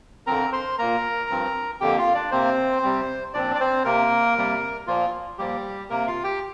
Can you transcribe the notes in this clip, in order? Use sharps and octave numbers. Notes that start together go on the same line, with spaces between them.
F2 D3 F3 C4 A#4 A#5
C5 C6
A#2 A#3 A#4 A#5
G2 F3 C4
F2 D3 A#3 G4 G5
F4 F5
D4 D5
C3 A#3 C4 C5
C3 G3 C4
A#2 F3 C4 D4 D5
D5
C4 C5
C3 A#3 A#4
C3 G3 A#3
A#2 F3 A#3 F4
A#2 F3 G3 A#3 G4
C3 A#3 A#4
F4 F5
G4 G5